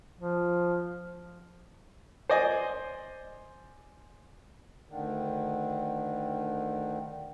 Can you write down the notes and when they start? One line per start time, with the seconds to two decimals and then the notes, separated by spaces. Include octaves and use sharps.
0.21 F3
2.30 C5 D5 D#5 G#5
4.88 D2 D3 D#3